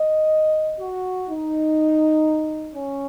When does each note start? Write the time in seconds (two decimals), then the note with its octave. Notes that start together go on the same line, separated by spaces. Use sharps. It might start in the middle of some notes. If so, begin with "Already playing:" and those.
Already playing: D#5
0.79 F#4
1.28 D#4
2.74 C#4